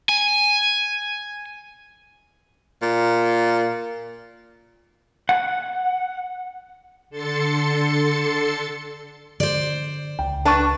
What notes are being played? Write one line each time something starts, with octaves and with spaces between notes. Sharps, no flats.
G#5
A#2
F#5
D3 A4 C6 A6 C#7
D3 C5 D5
C#2 G5
D4 B4 D5 A5 C#6 A6